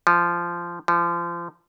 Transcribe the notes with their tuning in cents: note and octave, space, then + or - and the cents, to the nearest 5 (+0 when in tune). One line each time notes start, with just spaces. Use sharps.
F3 -15
F3 -30